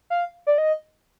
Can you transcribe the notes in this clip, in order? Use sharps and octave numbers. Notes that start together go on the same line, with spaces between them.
F5
D5
D#5